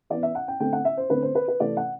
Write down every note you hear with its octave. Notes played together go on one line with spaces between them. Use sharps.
E3 B3 D5
E5
F#5
G5
D3 A3 C4 G5
F#5
E5
C5
D3 A3 C4 B4
C5
B4
B4
C3 E3 A3 C4 D5
F#5